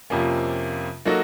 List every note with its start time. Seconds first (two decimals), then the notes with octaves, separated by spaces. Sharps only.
0.10 F2 C3 F3 A#3 C#4
1.05 F#3 A#3 D#4 F#4 A4